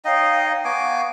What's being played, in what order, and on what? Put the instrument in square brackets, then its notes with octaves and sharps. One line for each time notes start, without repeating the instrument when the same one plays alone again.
[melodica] D#4 D#5 [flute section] C#5 F5 G5
[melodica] B3 G#5 D6 [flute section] F5 C#6